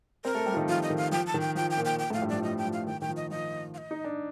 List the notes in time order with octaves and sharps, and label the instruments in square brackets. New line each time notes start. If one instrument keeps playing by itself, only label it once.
[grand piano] C4 C5 [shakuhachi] A#4
[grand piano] A3 A4
G3 G4
F4
D#3 D#4
[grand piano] F3 [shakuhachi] F4
[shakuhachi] D#5
[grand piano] D#3
[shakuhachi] F5
[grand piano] F3 [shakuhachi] G5
[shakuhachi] A5
[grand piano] D#3
[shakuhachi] G5
[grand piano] F3 [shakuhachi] G5
[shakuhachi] G5
[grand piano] A#2 A#3
[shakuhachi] G5
G5
[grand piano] A2 A3
[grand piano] F3 [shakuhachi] F5
[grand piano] G2 G3
[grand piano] F3 [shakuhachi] D5
[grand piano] F3 [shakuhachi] D#5
[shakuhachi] G5
[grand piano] F3
[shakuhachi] F5
[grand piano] D#3 [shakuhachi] G5
[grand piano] D#3 [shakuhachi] G5
[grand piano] F3
[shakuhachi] D#5
[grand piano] F3 [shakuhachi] D#5
[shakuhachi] F5
D#5
[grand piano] D#4
D4